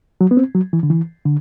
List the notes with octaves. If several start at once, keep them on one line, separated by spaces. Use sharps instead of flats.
F#3
B3
C4
F#3
E3
D3
E3
D3